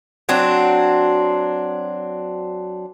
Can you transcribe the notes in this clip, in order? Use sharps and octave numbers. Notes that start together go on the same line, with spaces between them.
F#3 C4 D4